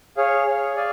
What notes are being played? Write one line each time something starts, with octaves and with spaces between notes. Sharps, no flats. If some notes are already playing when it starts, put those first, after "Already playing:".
G#4 C#5 F5
G#4 C#5 F5
G#4 D5 F5 G#5